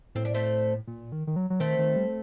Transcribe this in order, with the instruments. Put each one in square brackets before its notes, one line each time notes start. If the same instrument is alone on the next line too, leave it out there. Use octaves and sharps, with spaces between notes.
[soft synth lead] A2 [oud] C4
[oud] D4
A3 C4
[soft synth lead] A#2
D#3
D#3
F#3
F#3
[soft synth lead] D#3 [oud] A3 C4
[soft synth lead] D#3
G3